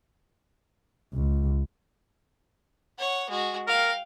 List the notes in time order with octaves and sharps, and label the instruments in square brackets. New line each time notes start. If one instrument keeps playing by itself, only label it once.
[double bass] C#2
[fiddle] C#5 F#5
G#3 F#4
[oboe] A#4 [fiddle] F5 G5